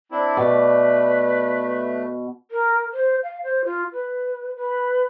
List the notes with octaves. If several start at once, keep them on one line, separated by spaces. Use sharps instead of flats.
C4 D4 E4
B2 A3 B4 D5
A#4
C5
F5
C5
F4
B4
B4